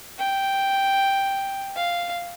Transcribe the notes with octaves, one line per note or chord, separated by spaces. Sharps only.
G5
F5